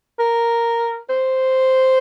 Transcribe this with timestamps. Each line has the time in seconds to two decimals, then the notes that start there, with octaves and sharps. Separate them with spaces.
0.19 A#4
1.10 C5